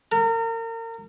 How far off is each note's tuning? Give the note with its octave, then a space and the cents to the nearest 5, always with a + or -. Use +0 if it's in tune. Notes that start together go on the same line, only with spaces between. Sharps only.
A#4 -35